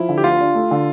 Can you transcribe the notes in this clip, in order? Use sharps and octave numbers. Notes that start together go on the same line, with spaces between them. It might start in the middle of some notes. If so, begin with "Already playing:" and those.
Already playing: F3 E4
D3
G4
D2 F4
D4
A3
D3